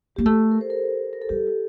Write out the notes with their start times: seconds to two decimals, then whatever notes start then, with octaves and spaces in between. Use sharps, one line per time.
0.16 A#3 G4
0.26 A3 A4
0.51 A#4
0.61 C5
0.70 A#4
1.13 A#4
1.22 A4
1.29 G3 G4